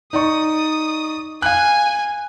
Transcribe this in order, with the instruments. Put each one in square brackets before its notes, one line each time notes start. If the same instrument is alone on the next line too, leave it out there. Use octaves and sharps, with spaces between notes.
[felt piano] D#4 D5 C#6 [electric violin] D#6
[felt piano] F5 F#6 [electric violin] G#5